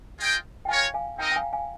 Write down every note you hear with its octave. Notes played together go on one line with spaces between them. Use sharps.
F4 G#4 D#5 G5
G5
F4 A#4 C#5 F5 G#5
F5 G#5
C4 D#4 A#4 D#5 G5 A#5
G5
F5 G#5
F5 G#5